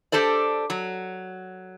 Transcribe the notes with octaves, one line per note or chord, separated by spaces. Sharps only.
D4 G4 A4 C5 D5
F#3